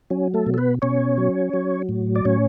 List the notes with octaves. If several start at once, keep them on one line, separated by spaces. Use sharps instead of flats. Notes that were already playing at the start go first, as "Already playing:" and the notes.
F#3 C#4
A3 A4
B2
A4
B3 B4
B2 C#4 C#5
F#3
F#3
A2
D5
A2 C#4 C#5